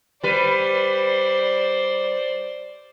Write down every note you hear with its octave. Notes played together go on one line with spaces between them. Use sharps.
G3 B4 C5 D5